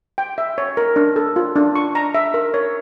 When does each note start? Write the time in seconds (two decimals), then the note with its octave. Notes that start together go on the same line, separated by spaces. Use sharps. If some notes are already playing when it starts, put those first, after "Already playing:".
0.18 G5
0.38 E5
0.58 C#5
0.77 A#4
0.96 D4
1.16 A4
1.36 F4
1.56 D4
1.75 C#6
1.95 A#5
2.15 E5
2.34 A#4
2.54 C#5